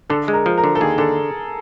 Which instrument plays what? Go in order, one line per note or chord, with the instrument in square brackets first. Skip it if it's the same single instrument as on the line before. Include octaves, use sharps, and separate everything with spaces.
[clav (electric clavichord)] D3 [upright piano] A4
[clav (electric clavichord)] G#3
[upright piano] A#4
[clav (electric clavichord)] F3
[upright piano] A#4
[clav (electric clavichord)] D3
[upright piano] A4
[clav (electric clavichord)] D#2 [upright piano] G#4
[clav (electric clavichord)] D3 [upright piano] A4